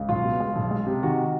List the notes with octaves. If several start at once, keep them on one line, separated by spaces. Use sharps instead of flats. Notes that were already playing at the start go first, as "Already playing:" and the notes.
Already playing: C#2
B1 F4
B2
G#3
B1
G#3
C3
D#3 F#4